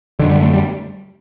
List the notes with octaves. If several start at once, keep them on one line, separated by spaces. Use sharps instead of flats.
F#2 D3 D#3
G3
A3
G3